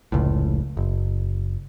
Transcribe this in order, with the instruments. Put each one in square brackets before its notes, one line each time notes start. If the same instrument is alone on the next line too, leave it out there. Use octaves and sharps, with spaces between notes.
[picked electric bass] F1 C#2 A2
F#1